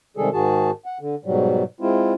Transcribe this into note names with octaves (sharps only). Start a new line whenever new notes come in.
C3 D#3 G3 G#3 G#4 A4
G#2 D#3 F#4 G#4 A5
F#5
D3
G#2 B2 F#3 G3
G#3 C4 E4 F4